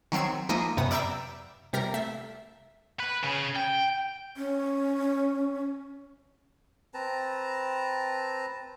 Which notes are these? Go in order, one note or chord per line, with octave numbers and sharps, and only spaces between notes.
D#3 F#3 C4 E6 G#6
F3 G#3 A#3 D#4 D#5 E5
F#2 C3 B3 D#6
D5 E5 G5 A#5 E6 B6
C3 G3 A#4 A#5
A3 E5
B4
C#3
G5
C#4
C4 B4 A5 A#5